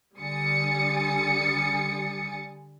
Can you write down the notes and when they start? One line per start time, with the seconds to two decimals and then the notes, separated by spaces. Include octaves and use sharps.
0.17 D3 G3 G#5 D#6 A6 C#7